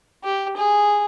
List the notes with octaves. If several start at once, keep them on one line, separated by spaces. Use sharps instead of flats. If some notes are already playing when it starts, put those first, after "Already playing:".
G4
G#4